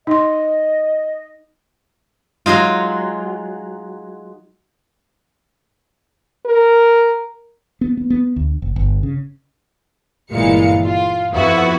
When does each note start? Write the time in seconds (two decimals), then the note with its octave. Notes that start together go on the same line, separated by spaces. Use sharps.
0.07 D#4 D#5 C6
2.46 F#3 G#3 D#4 F4
6.46 A#4
7.81 B3
7.97 B3
8.10 B3
8.36 D2
8.62 F#1
8.76 G1
9.03 C#3
10.31 G1 A#2 E3 G#3 F5 C#7
10.84 F4
11.32 F2 F3 B3 E4 F#4 B4